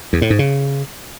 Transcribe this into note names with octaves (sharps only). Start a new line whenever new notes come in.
E2
A2
G#2
C#3